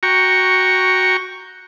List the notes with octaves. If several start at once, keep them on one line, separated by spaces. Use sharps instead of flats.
F#4 G5 A#5 C#6